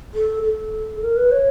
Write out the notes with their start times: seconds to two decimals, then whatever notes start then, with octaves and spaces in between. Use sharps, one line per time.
0.14 A4
0.43 A4
1.02 A#4
1.17 B4
1.32 C#5